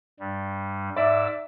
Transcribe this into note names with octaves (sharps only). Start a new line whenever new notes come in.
G2 G3
G#2 D5 E5 D6 E6